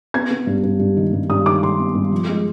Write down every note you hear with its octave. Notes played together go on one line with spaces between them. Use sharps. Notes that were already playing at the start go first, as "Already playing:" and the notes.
B3 G#6
B3
G2
G2
G2
D#3
G2
G2 D#6
D#3 D6
D#3 C6
B3
G2
F3
G#3